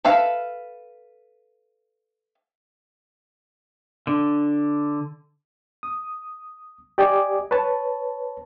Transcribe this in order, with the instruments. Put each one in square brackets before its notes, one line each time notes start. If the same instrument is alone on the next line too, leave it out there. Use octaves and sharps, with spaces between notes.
[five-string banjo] A4 B4 E5 F5
[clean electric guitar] D3
[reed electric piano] D#6
G4 D5 D#5 G#5 D6
B4 C#5 A5